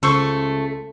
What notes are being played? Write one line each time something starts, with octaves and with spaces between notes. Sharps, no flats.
C#2 C#3 A3 C5 C#6 E6